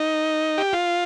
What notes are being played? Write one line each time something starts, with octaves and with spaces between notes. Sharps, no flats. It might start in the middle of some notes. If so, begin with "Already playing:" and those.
Already playing: D#4
G4
F4